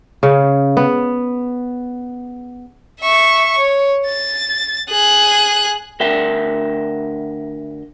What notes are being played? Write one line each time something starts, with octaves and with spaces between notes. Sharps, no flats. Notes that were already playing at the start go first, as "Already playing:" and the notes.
C#3
B3
E5 C#6
C#5
A6
G#4 F#6
D2 A#4 E5 G5